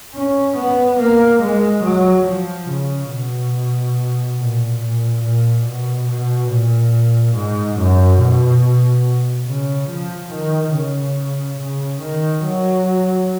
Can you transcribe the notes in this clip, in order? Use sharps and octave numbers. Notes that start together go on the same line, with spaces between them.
C#4
B3
A#3
G#3
F#3
F3
C#3
B2
A#2
A#2
A#2
B2
B2
A#2
G#2
F#2
B2
C#3
F3
D#3
C#3
C#3
D#3
F#3